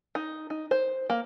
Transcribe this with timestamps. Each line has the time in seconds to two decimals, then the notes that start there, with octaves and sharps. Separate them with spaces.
0.15 D#4
0.50 D#4
0.71 C5
1.10 A#3